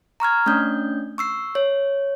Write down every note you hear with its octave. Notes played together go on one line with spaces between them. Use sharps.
A#5 C#6 F6 G#6
A3 C#4 D4 G6
C#6 E6 C7
C#5